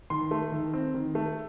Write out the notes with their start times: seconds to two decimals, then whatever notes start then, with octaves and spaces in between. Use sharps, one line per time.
0.10 D#3 C6
0.31 A3
0.52 D#3
0.74 C4
0.94 D#3
1.15 A3